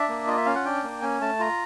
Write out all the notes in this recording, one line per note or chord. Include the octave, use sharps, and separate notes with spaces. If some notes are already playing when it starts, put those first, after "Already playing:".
Already playing: D4 E5
A#3
F4 D#5
E5
C#4 F5
F#5
D4 G5
A#3
C#4 G#5
A3 A5
F4 A#5